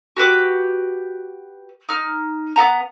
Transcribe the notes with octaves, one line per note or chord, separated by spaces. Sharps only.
F#4 G4 B4 D6
D#4 F6
B3 D#5 F#5 A#5